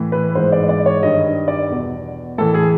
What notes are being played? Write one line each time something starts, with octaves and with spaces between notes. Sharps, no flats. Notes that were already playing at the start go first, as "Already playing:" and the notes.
Already playing: A2 E3
B4
G#2 E3 C5
D5
D5
C#5
G2 D#3 D#5
D5
E2 B2
A2 E3 A4
G#4